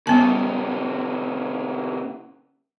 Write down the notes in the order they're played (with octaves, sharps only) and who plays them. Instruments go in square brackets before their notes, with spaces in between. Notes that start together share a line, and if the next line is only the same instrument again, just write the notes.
[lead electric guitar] A#2 C#3 [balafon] G3 B3 A5